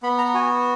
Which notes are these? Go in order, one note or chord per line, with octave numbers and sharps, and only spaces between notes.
B3 B5
A#5
F#4 G#5